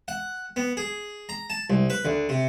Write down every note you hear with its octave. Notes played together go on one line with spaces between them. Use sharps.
F#5
B3
G#4
A#5
A5
C2
B4
D2
C3